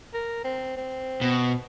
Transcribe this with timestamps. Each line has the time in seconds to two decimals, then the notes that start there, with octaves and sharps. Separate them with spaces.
0.14 A#4
0.44 C4
0.77 C4
1.21 B2